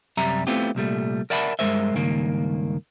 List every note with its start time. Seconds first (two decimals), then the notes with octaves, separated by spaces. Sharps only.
0.17 F#2 C3 G3 E5 A#5
0.47 A3 B3 C4 E4 F4 G4
0.75 C2 A#2 G3 A3
1.30 A#4 D5 E5 F#5 A5 B5
1.59 G2 G#3 A#4 C5 E5
1.94 C#2 G2 D#3 A#3